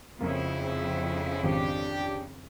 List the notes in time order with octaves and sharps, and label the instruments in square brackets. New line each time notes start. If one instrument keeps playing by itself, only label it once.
[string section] F2 C#3 [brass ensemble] G#2 C4 E4 [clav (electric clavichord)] A#3 A#4
[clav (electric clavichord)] G#1 F3 C4 [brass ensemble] D4 G4